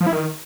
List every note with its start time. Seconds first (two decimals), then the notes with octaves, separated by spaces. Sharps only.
0.01 F3
0.07 E4
0.13 D#3